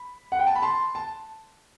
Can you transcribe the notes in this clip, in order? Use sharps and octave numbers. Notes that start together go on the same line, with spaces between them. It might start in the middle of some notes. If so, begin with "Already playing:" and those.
Already playing: B5
F#5
G5
A5
B5
A5 C6
A5